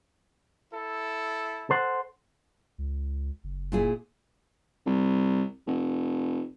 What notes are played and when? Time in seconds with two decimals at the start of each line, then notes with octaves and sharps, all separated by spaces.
0.70 E4 A4
1.70 A4 C5 F#5
2.78 C#2
3.44 F#1
3.72 A#2 E4 G#4
4.86 C2
5.67 F1